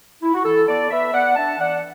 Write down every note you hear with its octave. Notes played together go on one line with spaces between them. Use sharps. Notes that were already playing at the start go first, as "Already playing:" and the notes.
E4
F#4
E3 E4 A4
B3 A4 D5
B3 B4 E5
B3 D5 F#5
D4 E5 A5
E3 D5 F#5